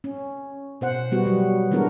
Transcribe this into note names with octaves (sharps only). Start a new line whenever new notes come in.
C#4
B2 C5 F#5
G3 B3 F#4
F#3 G3
E3 G#3 B3 D4 F#4 A#4